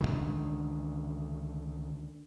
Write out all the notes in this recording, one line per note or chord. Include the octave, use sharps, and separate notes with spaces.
C#2 B2 D3 D#3